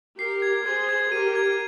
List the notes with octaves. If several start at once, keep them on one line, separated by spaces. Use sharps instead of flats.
G4 A#4 C7
G#6
G#4 C5 G#6
G#6
G4 A#4 D#7
G#6